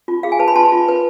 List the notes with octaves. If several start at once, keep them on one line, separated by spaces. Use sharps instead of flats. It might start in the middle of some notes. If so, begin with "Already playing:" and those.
F4
G#4 F5
G#5
B4 A5
B5
F4 A5 C6
F4
B4